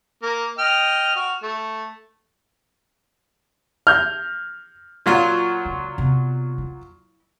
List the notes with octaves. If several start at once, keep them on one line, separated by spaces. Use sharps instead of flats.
A#3
D#5 G5 F6
F#4 F6
A3
F6 G6
A#2 F#3 F4
C#2
C3 B3
E4